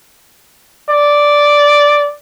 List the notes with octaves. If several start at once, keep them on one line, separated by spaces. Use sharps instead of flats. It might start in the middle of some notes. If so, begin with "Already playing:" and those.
D5